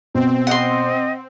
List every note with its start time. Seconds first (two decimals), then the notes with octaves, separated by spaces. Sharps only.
0.14 B2 C4
0.47 D#5 F#5 C6